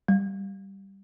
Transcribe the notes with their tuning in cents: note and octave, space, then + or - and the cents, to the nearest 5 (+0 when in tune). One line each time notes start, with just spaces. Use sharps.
G3 -5